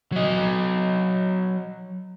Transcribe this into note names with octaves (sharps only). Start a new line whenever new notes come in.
F#3 D#5